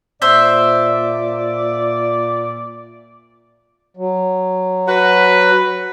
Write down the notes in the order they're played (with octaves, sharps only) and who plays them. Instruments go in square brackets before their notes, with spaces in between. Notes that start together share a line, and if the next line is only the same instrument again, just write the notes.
[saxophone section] A#2 D5 [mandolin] C5 E5
[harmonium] F#3
[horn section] F#4 B4